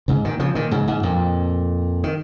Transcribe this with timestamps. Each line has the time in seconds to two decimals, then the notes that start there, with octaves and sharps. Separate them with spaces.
0.08 G#2 C#3
0.24 A#2 D#3
0.39 C#3 F3
0.55 A#2 D#3
0.71 G#2 C#3
0.88 G#2
1.03 F2 A#2
2.04 D#3